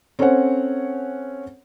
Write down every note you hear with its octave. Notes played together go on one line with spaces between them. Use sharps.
C4 C#4 A4 C5 C#5 F#5